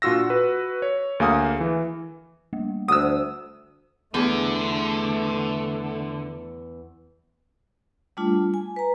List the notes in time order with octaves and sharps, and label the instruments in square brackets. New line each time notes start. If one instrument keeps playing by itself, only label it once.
[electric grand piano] A#2 D4 F4 F#4 E6 A#6
F#4 B4
C#5
D2 A#3 G#4 F5 G#5 D#6
E3
[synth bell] G3 A3 A#3
[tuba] D2 [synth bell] C5 F#5 [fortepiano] D#6 E6
[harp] E2 G#4 [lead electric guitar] D3 [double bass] A3
[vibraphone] G3 A3 D4 F4
G#5
B4 A#5